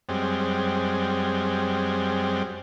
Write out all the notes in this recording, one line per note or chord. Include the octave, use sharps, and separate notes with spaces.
F#2 G3 G#3 C4